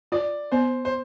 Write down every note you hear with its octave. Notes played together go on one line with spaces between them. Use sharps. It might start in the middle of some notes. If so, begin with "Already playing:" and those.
F4 D5
B3 C5
C5